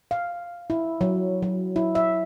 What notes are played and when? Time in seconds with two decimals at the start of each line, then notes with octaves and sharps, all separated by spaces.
0.11 F5
0.70 E4
1.01 F#3
1.43 F#3
1.76 E4
1.95 E5